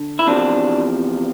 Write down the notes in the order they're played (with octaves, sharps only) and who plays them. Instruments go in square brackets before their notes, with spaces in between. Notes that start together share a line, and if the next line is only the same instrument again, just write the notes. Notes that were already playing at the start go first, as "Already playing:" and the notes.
Already playing: [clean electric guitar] D3
E4
E2 C3 F3 D4